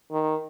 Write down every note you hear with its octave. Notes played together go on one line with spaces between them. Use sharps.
D#3